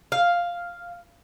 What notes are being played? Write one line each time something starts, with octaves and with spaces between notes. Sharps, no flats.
F5